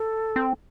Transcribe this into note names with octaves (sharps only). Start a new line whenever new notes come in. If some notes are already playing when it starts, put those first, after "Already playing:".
Already playing: A4
C4